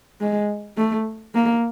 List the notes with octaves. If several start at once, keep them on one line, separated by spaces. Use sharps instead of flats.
G#3
A3
A#3